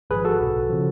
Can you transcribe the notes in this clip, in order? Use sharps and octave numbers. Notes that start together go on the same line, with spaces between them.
G#1 G#2 F3 G#4 B4
F#4 A4
B1 B2
C#3 F3